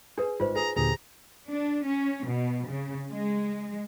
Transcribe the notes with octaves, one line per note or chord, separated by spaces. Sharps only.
D4 G#4 B4
G#1 F4 B4 C5
G#4 B4 A#5
D#2 A#2 D3 G4 G#4 A#5
D4
C#4
B2
C#3
G#3